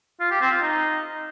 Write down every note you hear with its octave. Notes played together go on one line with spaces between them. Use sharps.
F4
G4
C4
F4
D#4